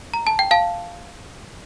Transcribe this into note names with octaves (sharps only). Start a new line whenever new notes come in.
A#5
A5
G5
F5 A5